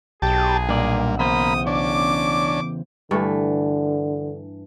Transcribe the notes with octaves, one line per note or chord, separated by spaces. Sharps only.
B1 G4 G#4 A5
G2 A#2 D5
E2 C#3 A#3 C5 B5 D#6
C#4 D4 D6
G2 D3 E3 A3